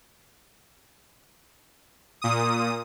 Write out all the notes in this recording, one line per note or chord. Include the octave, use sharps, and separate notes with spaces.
A#2 D#6